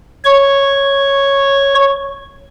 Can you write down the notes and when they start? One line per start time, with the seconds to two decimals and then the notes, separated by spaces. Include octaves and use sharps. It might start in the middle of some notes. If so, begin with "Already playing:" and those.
0.25 C#5 C#6